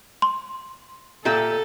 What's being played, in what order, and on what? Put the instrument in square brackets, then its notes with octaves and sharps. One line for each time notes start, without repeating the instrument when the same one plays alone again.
[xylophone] C6
[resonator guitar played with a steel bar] A#2 G4 E5 [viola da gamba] A4